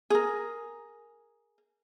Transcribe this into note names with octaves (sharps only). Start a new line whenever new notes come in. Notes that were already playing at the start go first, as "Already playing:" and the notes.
G#4 A#4